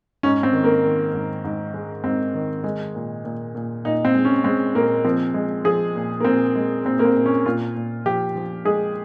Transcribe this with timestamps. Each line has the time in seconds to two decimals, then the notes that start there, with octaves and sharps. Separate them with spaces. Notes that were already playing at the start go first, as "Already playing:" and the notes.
0.23 G#2 C#4
0.43 C4
0.53 D#3
0.64 A#3
0.84 D#3
1.14 G#2
1.44 G#2
1.74 G#3
2.04 G#2 C4
2.34 D#3
2.64 G#3
2.95 A#2
3.25 A#2
3.55 A#2
3.85 A#2 D#4
4.05 C4
4.14 G#3
4.25 C#4
4.44 G#3 C4
4.75 A#2 A#3
5.05 F3 C4
5.34 G#3
5.64 F3 G#4
5.95 A#2
6.20 A#3
6.25 A#2 C4
6.55 G#3
6.85 A#2 C4
6.99 A#3
7.05 C4
7.16 A#2
7.26 C#4
7.46 A#2 F4
7.76 A#2
8.06 F3 G4
8.36 F3
8.65 G#3 G#4